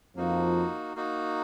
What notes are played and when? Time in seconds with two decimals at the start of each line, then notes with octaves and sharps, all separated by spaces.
0.16 F2 F3 A#3 D#4 F#4
0.95 A#3 D#4 F#4